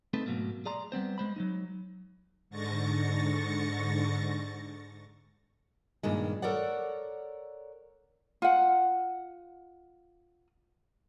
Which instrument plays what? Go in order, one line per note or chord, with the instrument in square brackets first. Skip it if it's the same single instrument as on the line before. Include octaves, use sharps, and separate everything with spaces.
[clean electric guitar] A3 C4 D#4 A4 B4
G#2 B2 F#3 A3 A#3
G#4 D5 A#5 C6
G3 B3 C4 C5
G#3 C5 B5
F#3 A3 D#4
[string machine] G#2 D3 C#6 A6 A#6 C#7
[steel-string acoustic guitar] G2 A#2 D#3 G#3
A4 A#4 C#5 D5 F#5
[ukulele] F4 F#5